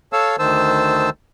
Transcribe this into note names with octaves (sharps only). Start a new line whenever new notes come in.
A4 C#5 F5 A5 E6
D2 D#3 C5 A5 E6